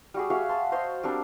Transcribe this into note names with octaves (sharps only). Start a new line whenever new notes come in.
G3 F#4 G#4
F#4 G#4 E5 F5
A5 C6
C5 C#5 D#5 C6
G3 C4 D4 A#4